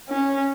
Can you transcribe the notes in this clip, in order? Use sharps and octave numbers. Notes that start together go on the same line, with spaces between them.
C#4